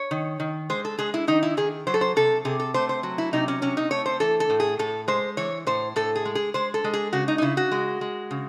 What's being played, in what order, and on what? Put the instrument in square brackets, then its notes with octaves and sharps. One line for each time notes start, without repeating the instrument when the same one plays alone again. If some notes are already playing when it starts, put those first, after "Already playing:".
Already playing: [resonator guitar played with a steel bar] C#5
D#3
D#3
G#3 C5
A4
G#3 G#4
E4
D#3 D#4
E4
D#3 G#4
F#3 C5
A4
C5
C3 A4
C3 G#4
A4
A3 C5
C5
F#3
E4
C3 D#4
C#4
C3 C#4
D#4
A3 C#5
C5
E3 A4
A4
A2
G#4
A2 A4
G#3 C5
E3 C#5
A2 C5
A2 A4
G#4
G#3
G#4
G#3 C5
A4
G#3
G#4
C#3 F#4
D#4
D#4
C#3 E4
F#4
G#3
G#3
C#3